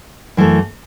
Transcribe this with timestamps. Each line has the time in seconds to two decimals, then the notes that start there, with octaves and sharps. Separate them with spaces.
0.37 F#2 E3 A3